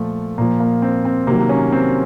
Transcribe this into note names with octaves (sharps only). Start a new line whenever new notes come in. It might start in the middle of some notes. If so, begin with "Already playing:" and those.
Already playing: A#2 F3 A3
A#2 F3 A#3
A#3
C4
C4
C3 D#3 F#3 A#3
C#4
C4